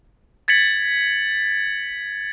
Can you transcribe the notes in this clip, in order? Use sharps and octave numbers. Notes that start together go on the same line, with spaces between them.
G#6 A6 B6 C#7 F#7